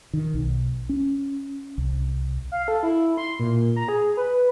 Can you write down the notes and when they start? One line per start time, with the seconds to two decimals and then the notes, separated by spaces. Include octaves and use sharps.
0.13 D#3
0.34 B1
0.89 C#4
1.78 C2
2.52 F5
2.68 A4
2.83 E4
3.17 C6
3.39 A#2
3.76 A#5
3.89 G#4
4.17 B4